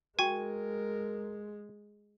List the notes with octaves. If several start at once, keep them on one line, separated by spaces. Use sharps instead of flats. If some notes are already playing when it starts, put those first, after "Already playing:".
G#3 F#4 A#4 G5 G#5 C#6